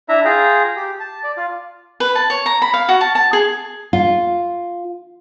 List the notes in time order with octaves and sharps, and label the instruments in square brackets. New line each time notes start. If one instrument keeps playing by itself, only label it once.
[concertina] D4 E4 E5 A#5
F4 G#4 G5 A#5
G4
A5
D5
F4
[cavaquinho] B4
A5
C#5
A#5
B5
F5
F#4
A5
A5
G#4
[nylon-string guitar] F4